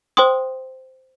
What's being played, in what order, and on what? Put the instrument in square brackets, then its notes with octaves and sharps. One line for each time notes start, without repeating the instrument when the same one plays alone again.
[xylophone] C5 G5 C6 D#6